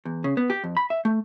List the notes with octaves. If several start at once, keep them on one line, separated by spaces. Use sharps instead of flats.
E2
C#3
B3
G4
F2
B5
E5
A3